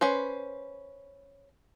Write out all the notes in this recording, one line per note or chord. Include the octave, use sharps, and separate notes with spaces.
C#4 B4 C5